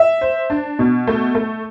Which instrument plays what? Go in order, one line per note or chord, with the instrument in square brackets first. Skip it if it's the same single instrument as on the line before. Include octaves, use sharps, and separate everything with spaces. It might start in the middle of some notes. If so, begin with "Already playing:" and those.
Already playing: [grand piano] E5
[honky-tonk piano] C5
D4
B2
A3
A3